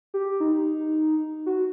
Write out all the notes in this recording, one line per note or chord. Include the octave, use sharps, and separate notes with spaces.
G4
D#4
F#4